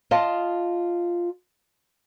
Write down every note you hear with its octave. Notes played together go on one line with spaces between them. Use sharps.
F4 D#5 F5 A5